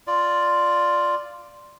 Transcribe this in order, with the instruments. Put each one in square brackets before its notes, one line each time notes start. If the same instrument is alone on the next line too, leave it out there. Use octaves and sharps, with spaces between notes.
[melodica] F4 D5